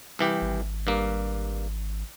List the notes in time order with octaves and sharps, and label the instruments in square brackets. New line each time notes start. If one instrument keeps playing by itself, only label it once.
[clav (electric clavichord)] C2 E3 G4
[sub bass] G#1
[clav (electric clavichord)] G2 A#3